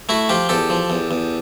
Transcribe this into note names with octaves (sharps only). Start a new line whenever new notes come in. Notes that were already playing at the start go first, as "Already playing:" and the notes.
A3 E4 F#4
F3 F4 G4
E2 G4 A4
F3
E2
E2